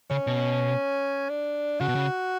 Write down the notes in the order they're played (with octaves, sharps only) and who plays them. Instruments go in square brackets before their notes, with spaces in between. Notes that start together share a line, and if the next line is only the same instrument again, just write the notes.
[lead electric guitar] C#3 [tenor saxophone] C#4
[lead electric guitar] B2
[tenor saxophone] D4
[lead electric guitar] C#3 [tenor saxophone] F#4
[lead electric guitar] B2
C#3